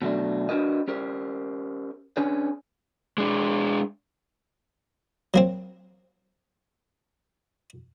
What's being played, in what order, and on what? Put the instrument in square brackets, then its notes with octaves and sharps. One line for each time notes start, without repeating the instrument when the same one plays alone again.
[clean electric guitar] B2 F#3 A3 D4
D4 F#4 A#4 B4 D#5
C#4 G4 A#4 C5
C#4 D4 G#4 B4 C#5
[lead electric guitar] G#3 D4
[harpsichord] F#3 A#3 C4